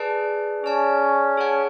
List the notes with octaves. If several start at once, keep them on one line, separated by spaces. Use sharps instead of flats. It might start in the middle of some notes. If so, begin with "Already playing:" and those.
Already playing: G#4 B4 D5 A5
C#4 G#4 D5 A5
G#4 C#5 F#5 A5